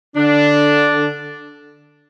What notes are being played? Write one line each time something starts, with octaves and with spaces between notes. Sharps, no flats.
D3 D4